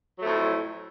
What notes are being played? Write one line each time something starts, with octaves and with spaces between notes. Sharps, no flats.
F2 A2 F#3 A3